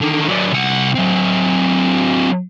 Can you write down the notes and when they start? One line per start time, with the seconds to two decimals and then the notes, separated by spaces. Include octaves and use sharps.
0.01 D3 D#3
0.28 F#3 D4
0.52 C2 F#5
0.95 F#3 C4